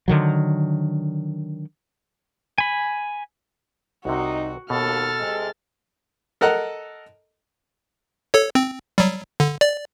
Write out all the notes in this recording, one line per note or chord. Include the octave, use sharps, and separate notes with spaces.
D3 D#3 F#3
G#5 B5
C2 C3 D#4 F#4
D#2 B2 A4 F6 A6
C3 G#3
A4 A#4 D#5 F#5 A#5
A4 C#5
C4
F#3 G3
D3
D5